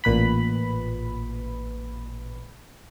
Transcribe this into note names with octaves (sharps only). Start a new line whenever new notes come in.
A1 A#2 B4 B5